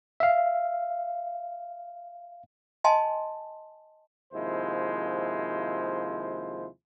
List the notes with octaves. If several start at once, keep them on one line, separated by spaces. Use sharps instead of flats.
E5 F5
D#5 G#5 A5 C6
D#2 C3 F3 G#3 E4 C5